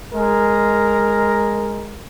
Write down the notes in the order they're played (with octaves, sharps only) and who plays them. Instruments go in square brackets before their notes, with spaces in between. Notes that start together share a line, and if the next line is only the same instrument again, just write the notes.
[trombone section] G#3 A#4